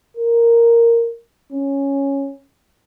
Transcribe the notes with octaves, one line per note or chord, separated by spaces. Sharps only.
A#4
C#4